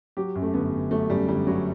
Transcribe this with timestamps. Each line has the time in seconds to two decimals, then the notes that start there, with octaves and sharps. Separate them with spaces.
0.17 F#3 G4
0.35 F#2
0.42 A3
0.54 G1 B3
0.72 G1
0.91 F#3 A3
1.10 F#2 G3
1.28 G1 G3
1.47 G1 F#3